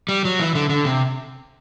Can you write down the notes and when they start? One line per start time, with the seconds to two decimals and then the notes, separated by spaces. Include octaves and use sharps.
0.09 G3
0.25 F#3
0.39 E3
0.55 D3
0.69 D3
0.85 C3